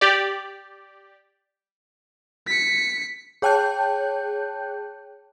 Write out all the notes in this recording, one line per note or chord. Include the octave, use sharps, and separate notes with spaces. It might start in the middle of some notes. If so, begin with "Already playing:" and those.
G4 D5
B6 C#7
G#4 C#5 G5 A5 F#6 G6